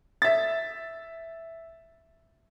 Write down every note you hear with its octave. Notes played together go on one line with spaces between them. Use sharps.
E5 A6